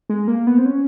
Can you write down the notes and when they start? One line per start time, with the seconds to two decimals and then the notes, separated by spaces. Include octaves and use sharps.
0.09 G#3
0.28 A#3
0.47 B3
0.58 C4
0.65 C#4